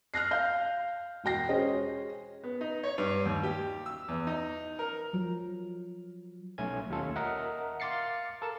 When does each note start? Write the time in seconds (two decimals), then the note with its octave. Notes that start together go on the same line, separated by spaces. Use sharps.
0.14 F6 F#6 A#6 C7
0.31 F5 G6
1.24 E1 F#4 G5 A#6 C7
1.49 C#4 G#4 C5 D#5
2.43 B3
2.61 D#4
2.83 C#5
2.98 G2
3.25 D#2
3.43 G4
3.86 E6
4.08 E2
4.27 D#4
4.79 A#4
5.13 F3 F#3
6.58 B1 A3 C#4 G#5 G#6
6.90 D#2 C#4 F4 A4
7.16 A#4 D#5 E5 F#5
7.80 F5 C6 D6 A6 C7 C#7
8.42 A4 A#4 A5